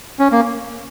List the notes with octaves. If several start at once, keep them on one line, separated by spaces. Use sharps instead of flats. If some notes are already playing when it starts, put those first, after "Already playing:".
C#4
A#3